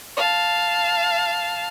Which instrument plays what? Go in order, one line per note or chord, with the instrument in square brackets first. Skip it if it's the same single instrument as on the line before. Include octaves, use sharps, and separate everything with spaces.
[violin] F5 A5